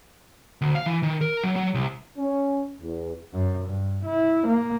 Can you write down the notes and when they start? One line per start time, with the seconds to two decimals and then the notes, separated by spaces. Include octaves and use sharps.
0.62 D2
0.75 F5
0.86 E3
1.03 D#3
1.21 A#4
1.43 F#3
1.56 F#3
1.74 C2
2.18 C#4
2.81 E2
3.33 F#2
3.65 G2
4.05 E4
4.47 A#3